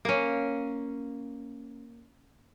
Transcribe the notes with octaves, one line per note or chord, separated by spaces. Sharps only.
A#3 C#4